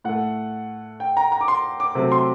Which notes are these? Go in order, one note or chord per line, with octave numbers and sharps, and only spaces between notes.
A2 A3 F#5
G5
A#5
A#5
D6
C6
D6
C3 F#3 A3
C6